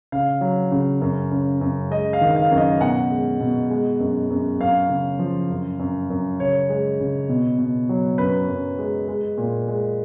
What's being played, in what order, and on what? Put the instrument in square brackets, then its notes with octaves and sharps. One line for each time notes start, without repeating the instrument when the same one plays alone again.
[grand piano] C#3 F5
F#3
C#3
F#2
C#3
F#2
G#3 D#5
F5
D#3
F5
F#2
D#5
B2 F#5
G#3
B2
G#3
F#2
F#2
F#2 F5
C#3
F3
F#2
F#2
F#2
C#3 C#5
G#3
C#3
B2
B2
F#3
F#2 B4
F#2
G#3
G#3
A#2
G#3